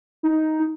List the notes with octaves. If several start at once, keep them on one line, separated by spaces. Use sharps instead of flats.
D#4